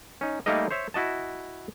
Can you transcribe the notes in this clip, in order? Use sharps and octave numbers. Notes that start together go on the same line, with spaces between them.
C#4 D#4
G3 A3 A#3 D#4 A#4 D#5
C5 C#5 E5
E4 F#4 D#5 A5